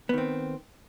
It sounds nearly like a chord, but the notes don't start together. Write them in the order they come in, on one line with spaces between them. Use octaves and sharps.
B3 D#3 C4